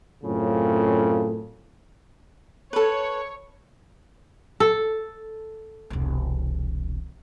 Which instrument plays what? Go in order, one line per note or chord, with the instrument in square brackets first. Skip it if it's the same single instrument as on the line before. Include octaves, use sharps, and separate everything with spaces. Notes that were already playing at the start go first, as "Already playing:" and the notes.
[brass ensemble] F#2 A2 C#3 C4 F4 A4
[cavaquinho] A4 B4 [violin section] C#5
[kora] A4
[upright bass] E1 C2